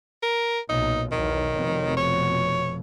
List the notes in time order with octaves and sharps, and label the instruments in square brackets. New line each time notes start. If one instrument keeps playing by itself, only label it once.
[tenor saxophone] A#4
[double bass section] B1 A#2 [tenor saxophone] D#4
[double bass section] B1 E2 [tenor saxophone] D#3
[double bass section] F1 F2 B2
[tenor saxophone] C#5